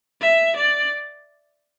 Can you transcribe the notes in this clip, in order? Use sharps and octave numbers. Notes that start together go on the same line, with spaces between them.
E5
D5